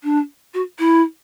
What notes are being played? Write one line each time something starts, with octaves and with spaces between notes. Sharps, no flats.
D4
F#4
E4